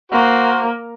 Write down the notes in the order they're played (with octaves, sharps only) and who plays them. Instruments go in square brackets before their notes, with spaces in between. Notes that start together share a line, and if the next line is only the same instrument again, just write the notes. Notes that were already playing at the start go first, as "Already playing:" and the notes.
[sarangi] A#3 [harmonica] F#4 C5 C6